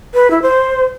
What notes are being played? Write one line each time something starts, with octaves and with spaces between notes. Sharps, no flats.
B4
E4
C5